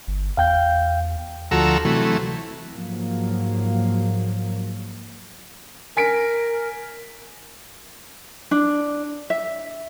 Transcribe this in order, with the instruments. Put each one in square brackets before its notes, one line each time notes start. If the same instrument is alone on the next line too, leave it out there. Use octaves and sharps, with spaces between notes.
[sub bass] G1
[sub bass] E2 [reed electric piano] F5 G5 G6
[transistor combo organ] D2 F3 F#4 A4 A#5 E6
C3 E3 F#3 A3
[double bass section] G#2 F3 F#3 A#3
[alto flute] A#4 [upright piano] G#5 B6 D7
[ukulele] D4
E5